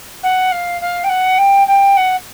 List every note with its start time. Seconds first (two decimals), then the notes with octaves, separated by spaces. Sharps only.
0.23 F#5
0.51 F5
0.81 F5
1.04 G5
1.09 F#5
1.38 G5
1.67 G5
1.96 F#5